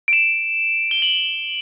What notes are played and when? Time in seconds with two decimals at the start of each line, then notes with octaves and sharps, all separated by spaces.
0.08 D7
0.13 E7
0.91 G7
1.02 F#7